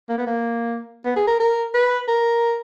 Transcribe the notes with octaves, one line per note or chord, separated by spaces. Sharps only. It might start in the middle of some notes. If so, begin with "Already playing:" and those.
A#3
B3
A#3
B3
G#4
A#4
A#4
B4
A#4